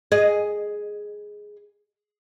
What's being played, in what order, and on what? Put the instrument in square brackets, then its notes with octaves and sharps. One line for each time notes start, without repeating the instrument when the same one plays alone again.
[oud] G#4 D#5